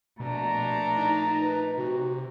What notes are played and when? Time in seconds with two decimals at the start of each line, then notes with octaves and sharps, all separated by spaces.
0.20 A#1 B2 A3 D4 A#5
0.97 D#4
1.39 B4
1.78 C3 F#4